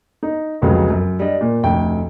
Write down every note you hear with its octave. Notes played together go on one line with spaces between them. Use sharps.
D#4
F1 C#2 C#3 F#3 B3
F#2
G3 D4 D#5
A#2
F1 D2 G5